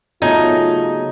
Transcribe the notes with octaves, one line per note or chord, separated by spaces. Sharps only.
C#3 F#3 A3 B3 D#4 F4 G#5